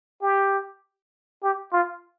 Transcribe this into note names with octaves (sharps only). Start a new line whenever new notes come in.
G4
G4
F4